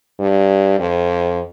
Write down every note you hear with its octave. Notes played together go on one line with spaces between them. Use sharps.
G2
F2